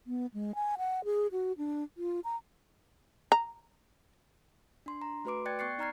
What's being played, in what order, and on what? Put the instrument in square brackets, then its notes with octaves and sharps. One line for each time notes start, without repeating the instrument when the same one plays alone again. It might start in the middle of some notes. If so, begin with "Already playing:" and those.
[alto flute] B3
G#3
G#5
F#5
G#4
F#4
D4
F4
A#5
[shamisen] A#5
[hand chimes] D4 C6
A#5
A3 F#4 B4 C6 D6 D7
D5 G5 F#6 G#6 A6 C#7
B3 C#6 F#6 A6 C7 C#7
D#4 D5 A#5 F6 G#6 C7